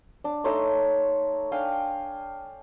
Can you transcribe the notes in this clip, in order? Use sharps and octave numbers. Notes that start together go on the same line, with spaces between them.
D4
A3 D#4 C#5 C6
D4 F5 G5 G#5